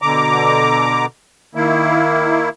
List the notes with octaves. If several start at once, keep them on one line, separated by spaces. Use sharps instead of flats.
B2 D3 A#5 D6
D#3 A#3 E4